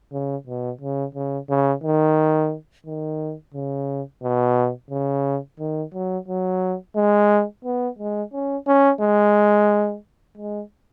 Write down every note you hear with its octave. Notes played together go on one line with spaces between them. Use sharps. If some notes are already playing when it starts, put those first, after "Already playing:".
C#3
B2
C#3
C#3
C#3
D#3
D#3
C#3
B2
C#3
D#3
F#3
F#3
G#3
B3
G#3
C#4
C#4
G#3
G#3